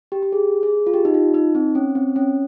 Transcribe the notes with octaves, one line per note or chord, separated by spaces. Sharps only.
G4
G4
G#4
G#4
F4
G4
D#4
F4
D#4
C4
C#4
C4
C#4